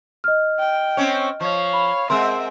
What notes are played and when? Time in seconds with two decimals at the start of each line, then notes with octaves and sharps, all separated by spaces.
0.24 D#5 F6
0.59 G5
0.97 C4 C#4 C#5
1.41 F3 C#5 F5
1.73 B5
2.10 G#3 C4 A#4 E5 F#5 C6